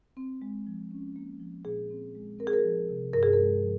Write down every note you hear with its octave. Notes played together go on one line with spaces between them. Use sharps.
C4
G#3
F3
C#4
A#3
F3
A#2 G#4
C4
G#3
C4 A#4
G#4
A#4
F3
C3
G2 A#4
G#4
G#3 A#4
F3